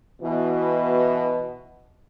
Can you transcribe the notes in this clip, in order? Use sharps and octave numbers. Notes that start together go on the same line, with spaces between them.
B2 E3